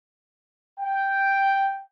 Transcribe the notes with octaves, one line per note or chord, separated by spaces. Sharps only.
G5